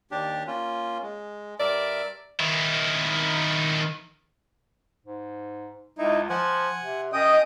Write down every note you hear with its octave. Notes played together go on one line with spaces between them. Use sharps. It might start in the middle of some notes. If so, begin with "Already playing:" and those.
D#2 D4 G4
A#3 C#4 F4
G#3
G2 A#4 D5 E5
D#3 E4
G#2
C#2 D#4 E4
F3 F#5 G#5
C3
F#2 D#5 G5 D#6